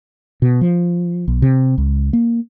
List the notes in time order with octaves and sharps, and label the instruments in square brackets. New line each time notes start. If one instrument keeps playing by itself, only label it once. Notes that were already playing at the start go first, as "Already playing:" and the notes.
[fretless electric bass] B2
F3
B1
C3
C#2
A#3